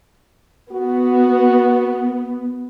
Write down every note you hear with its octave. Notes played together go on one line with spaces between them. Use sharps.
B3 F#4